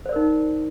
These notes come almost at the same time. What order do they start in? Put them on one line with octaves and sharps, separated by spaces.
C5 D5 A#4 D#4